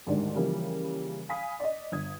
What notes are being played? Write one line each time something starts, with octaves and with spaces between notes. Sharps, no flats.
D2 G#2 D#3 G3 D4
C#3 E3 F3 G3 A#3
F5 G#5 B5 D#6 B6
D5 D#5
G1 D#6 G#6